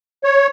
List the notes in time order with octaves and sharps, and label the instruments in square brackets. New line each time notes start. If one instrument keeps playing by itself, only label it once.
[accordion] C#5